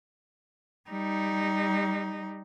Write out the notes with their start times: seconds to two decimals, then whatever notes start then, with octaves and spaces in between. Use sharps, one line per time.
0.90 G3 D#4